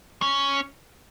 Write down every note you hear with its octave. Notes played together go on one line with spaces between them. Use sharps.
C#4